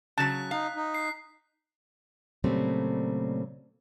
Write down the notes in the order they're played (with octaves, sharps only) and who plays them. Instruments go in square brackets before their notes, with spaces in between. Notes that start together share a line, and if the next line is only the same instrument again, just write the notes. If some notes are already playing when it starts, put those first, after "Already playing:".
[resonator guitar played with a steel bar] C#3 F#3 [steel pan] A5 [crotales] F#6 B6
[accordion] D#4 [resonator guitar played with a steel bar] F5
[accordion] D#4
[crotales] C7
[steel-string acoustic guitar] A#2 C#3 F#3 G3 A3 C4